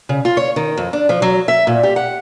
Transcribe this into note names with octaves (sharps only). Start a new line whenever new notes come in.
C#3
F4
C#5
D#3
F2
D4
F3
F#3
E5
A#2
G4
F#5